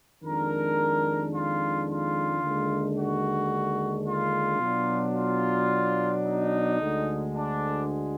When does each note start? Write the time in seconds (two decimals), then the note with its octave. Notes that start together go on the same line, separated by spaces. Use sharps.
0.23 F2 D#3 G#3 D4 A#4
1.33 F4
1.88 F4
2.43 D#2 D3 G#3 D4
2.97 F#4
4.06 F4
4.60 B2 F#3 D4
5.15 F4
6.24 D#4
6.79 D2 D3 G#3
7.34 D4